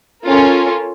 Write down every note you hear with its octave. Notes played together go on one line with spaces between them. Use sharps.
C#4 F4 A4 A#4